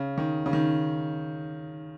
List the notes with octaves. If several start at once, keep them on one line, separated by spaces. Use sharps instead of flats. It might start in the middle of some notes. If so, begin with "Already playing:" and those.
Already playing: C#3
D#3
C#3
D#3